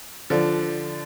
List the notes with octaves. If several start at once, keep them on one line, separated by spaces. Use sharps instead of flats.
D3 F3